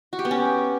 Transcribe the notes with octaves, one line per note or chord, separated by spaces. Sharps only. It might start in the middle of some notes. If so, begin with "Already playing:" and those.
F#4
G4
B3
C#4